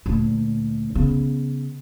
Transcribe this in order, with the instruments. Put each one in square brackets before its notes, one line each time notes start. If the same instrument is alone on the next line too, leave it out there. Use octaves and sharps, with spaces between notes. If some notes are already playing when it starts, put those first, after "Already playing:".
[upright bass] D2 A#2
C#3 B3